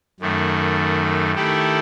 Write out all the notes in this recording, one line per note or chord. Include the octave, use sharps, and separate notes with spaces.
F#2 D#3 A3
D#3 A3 E4 G4